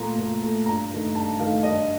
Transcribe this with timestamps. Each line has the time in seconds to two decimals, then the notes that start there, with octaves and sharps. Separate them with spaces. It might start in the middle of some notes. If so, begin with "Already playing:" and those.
Already playing: A#2 A3 A#5
0.18 A#2
0.42 A3
0.66 G2 A#5
0.91 D#3 A3
1.15 G2 A5
1.39 D#3 A3 F5
1.63 G2 D#5